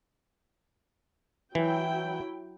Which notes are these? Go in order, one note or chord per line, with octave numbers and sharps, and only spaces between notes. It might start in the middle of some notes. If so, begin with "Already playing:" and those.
E3 F#3 E4 G5